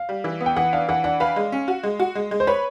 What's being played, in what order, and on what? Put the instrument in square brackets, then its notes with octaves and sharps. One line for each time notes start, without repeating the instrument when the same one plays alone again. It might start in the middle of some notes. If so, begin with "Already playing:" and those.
Already playing: [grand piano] F5
[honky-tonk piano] G3
E3
B3
[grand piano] G5
[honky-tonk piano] E3 [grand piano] F#5
[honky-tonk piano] D4 [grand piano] F5
[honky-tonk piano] E3 [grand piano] F#5
[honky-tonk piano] D4 [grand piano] F#5
[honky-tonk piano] B4 [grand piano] F5
[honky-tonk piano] G#3
C#4
F#4
G#3
F#4
G#3
G#3
[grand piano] C5
[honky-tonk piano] B4 [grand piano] C#5